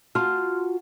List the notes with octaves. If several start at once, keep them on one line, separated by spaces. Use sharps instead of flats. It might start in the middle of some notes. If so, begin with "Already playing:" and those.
F4 F#4 A5 C6 F6